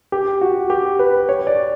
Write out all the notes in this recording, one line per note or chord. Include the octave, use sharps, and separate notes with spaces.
G4
F#4
G4
B4
C#5
D5